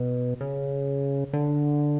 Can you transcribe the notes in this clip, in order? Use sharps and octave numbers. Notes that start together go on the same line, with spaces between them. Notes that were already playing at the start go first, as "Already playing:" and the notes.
Already playing: B2
C#3
D3